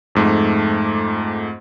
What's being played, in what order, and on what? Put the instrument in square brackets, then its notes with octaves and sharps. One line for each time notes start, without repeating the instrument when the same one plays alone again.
[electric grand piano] F2 G#2 A3